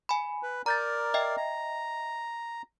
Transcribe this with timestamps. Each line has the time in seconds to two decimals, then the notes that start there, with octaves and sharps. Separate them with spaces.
0.09 G#5 B5
0.43 B4
0.66 A#4 D5 A#5 G6 A6
1.14 D#5 E5 G5
1.37 A#5